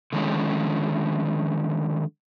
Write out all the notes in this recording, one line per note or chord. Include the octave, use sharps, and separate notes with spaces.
D3 D#3 F3 G#3 C#4